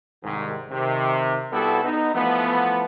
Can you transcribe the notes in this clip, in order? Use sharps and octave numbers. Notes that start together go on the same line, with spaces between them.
C2 G#2 D#3
C3 D#3
C2 G3 B3 E4 F#4 A4
B3 D#4
E3 F3 A3 B3